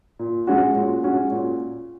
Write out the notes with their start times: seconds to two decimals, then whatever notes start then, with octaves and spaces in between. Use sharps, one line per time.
0.19 A#2
0.47 G#3 C#4 F#4
0.75 A#2
1.03 G#3 C#4 F#4
1.32 A#2